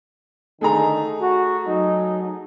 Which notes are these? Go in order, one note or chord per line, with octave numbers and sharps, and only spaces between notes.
D3 D#3 A3 D#4 G#4 A#5
F#4
F#3 D#4